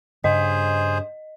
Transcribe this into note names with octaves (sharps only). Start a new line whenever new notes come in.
G2 C#3 G#4 C5 D#5